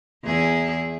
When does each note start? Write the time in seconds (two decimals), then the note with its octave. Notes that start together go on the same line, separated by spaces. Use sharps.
0.24 E2 E4 G#4